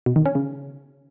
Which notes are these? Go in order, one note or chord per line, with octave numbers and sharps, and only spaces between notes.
B2
D#3
C#4
C#3